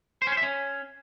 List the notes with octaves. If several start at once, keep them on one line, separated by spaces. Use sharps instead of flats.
C5
C#4
C5
E5
C#4